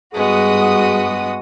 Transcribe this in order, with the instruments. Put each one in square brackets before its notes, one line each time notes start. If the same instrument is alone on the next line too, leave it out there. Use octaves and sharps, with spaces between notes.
[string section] G2 F#4 D#6 [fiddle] G#3 B3 [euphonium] G#4